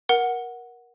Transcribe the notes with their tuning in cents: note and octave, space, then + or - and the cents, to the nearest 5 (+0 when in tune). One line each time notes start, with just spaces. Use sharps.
A#4 +20 F#5 +0